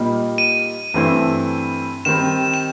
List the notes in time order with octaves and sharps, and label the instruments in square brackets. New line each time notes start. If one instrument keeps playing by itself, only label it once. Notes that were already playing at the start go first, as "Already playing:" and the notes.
Already playing: [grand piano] A#2 G3 A#3 D#4
[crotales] D#7
[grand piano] G2 E3 A3 C4 E4
[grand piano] D#3 G3 C4 [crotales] E7
[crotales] E7